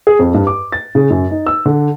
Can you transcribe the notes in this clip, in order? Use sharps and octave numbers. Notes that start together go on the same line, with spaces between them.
G#4
F2
G2
D6
A6
C#3
F#2
D#4
E6
D3